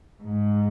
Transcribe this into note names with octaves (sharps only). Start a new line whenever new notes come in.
G#2